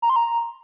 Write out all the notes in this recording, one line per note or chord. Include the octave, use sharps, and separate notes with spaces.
A#5
C6
A#5